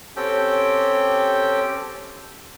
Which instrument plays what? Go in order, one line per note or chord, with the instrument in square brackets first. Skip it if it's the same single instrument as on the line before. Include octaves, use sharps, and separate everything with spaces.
[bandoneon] C4 C#4 G4 A4 G5